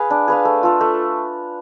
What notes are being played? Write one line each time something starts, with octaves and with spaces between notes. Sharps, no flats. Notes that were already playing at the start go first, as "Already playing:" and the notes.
Already playing: G#4 B4 F5
D4
G#4 B4 F5
A3
F4 A4
A3